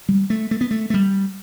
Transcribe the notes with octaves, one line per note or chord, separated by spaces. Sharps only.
G3
A3
A3
B3
A3
A3
G3